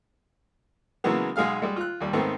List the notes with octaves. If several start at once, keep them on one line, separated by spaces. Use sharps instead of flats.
C#3 E3 F#3 G#3 A#3 B3
B1 G#3 G#4 F5 F6
G3 G#3
F4 F#6
D#2 G3
G#2 D#3 A3 B3 C4